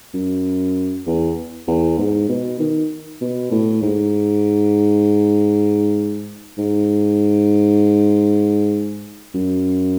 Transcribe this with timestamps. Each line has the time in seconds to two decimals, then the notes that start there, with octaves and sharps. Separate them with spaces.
0.14 F#2
1.06 E2
1.67 E2
1.98 G#2
2.29 B2
2.59 D#3
3.21 B2
3.52 A2
3.82 G#2
6.58 G#2
9.34 F#2